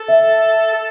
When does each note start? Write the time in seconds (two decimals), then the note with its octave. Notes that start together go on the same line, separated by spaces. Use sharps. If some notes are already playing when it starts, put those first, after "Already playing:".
Already playing: A4
0.08 E5
0.73 A4